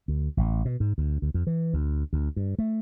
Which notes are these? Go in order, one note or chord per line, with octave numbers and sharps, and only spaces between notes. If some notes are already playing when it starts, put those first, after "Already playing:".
D2
A1
B2
G#2
D2
D2
F2
E3
D2
D2
G2
A3